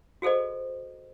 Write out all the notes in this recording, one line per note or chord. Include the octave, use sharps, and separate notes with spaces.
F#4 G#4 A4 C5 D#5